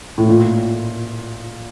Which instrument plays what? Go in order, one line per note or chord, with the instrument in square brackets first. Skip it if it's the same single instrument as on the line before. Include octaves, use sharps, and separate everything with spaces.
[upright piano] A2
A#2